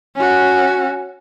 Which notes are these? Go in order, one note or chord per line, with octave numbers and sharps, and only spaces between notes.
C#4 F#4